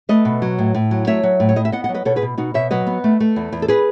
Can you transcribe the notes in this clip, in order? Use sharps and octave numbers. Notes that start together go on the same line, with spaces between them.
A3 B4 D#5
B2
F#3
A2
A2
F#3
A3 C#5 E5
F#3
A2
C#5
A2 D#5
E5
B3 D#5 F#5
D#5 F#5
F#3
B4 D#5
B2 A4 C#5
G#4 B4
B2
B2 D#4 F#4
B2 C#5 E5
F#3 B4 D#5
B3
A3
A3
E2
E2
A4
G#4 B4